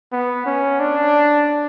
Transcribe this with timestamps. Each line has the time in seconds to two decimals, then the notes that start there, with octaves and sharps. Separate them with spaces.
0.12 B3
0.46 C#4
0.79 D4